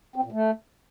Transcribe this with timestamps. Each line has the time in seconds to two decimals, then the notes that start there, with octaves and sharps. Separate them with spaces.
0.16 C4
0.24 A#2
0.32 A3